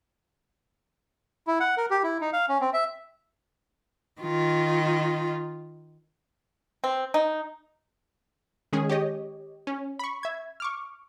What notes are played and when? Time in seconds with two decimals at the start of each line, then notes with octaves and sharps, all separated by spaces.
1.47 E4
1.60 F#5
1.77 A#4
1.91 G4
2.04 E4
2.21 D#4
2.33 F5
2.49 C#4
2.61 C4
2.73 E5
4.21 D#3 F4
6.84 C4
7.14 D#4
8.73 D#3 G#3 C#4 G#4
8.89 G4 C#5 D#5
9.67 C#4
9.99 B5 C#6
10.23 E5 G#6
10.60 C#6 D6 F6